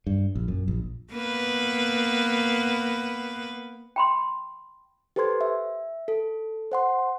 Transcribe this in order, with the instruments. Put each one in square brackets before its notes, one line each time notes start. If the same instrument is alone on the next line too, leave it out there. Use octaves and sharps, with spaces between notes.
[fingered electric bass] G2
A#1
F#2
A#1
[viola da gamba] A#3 B3 B4
[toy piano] G5 B5 C6
[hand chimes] G4 A4 B4 C5 C6 G#6
E5
A4
C5 F#5 C6